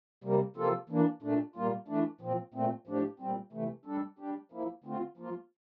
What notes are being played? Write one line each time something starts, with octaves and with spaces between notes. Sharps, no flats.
C3 G3 A#3
C3 F3 A#3 F4 A4
E3 A#3 D4
A#2 A3 D4
A#2 G3 A#3 F4
E3 A3 D4
A#2 F3 C4
A#2 A3 C4
A2 F3 A3 D4 G4
A#2 G3 C4
C3 E3 A3
G3 D4 A4
G3 D4 G4
F3 A#3 E4
D3 A3 C4 F4
F3 A#3 F4